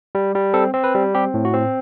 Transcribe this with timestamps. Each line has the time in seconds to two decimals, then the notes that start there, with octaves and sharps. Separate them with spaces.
0.15 G3
0.35 G3
0.54 C4 A4
0.74 C4
0.84 B4
0.95 G3
1.15 C4 G4
1.34 A2
1.45 F#4
1.54 C4